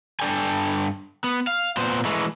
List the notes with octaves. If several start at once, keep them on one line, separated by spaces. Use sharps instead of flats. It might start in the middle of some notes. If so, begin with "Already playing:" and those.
G2 D4 A4 D5 G5 G#5
B3
F5
A#2 B3 C5
E3 G#3 A3